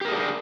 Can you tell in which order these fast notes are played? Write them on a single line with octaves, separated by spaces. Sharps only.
G4 A#4 G#4 D4